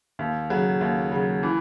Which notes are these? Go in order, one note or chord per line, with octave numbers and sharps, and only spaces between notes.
D#2
C#3 F#3
D#2
C#3 F#3
E3